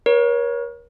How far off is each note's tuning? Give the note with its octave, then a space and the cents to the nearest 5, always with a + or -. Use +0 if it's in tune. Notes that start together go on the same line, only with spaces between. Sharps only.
A#4 +40 C#5 +0